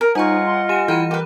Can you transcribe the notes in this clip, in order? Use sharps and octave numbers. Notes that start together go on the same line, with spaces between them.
A#4
G3 D#4 F4 G#4 C#5 D#5 F#5 A#5
C6
G4 G#5 D#7 E7
E3 E4 G5 A#5 D#7
G4 A#4 B4